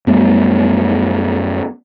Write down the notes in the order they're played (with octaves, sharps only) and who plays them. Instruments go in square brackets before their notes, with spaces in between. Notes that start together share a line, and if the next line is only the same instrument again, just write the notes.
[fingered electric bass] F#2 G3 A3 B3